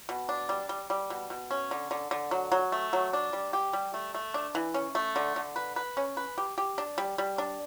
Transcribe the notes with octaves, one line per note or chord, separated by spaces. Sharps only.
B2
D4
G3
G3
G3
B2
B2
C#4
D3
D3
D3
F#3
F#3
A3
F#3
D4
G3
G4
G3
A3
A3
D4
E3
C#4
A3
D3
D3
B4
B4
C#4
B4
G4
G4
D4
G3
G3
D4